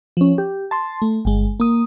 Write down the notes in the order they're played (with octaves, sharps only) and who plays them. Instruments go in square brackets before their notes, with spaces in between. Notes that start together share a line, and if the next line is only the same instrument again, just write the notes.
[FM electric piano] F3 C#4
G4
A5 C6
A3
G1 G#3
A#3 D#6